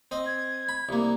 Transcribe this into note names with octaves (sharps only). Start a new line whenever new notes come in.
C4 D#5
G#6
B5
C2 A#3